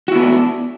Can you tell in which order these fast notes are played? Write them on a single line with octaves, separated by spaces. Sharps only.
F#4 E4 B3 A3 D4